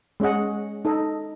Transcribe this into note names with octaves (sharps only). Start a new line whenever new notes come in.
G#3 C#4 G#4 D#5 F#5
D#4 A4 D#5